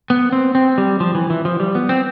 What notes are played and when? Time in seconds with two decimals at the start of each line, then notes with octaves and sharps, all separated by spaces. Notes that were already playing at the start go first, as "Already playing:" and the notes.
0.10 B3
0.32 C4
0.55 C4
0.78 G3
1.00 F3
1.15 E3
1.30 E3
1.45 F3
1.60 G3
1.75 B3
1.89 C4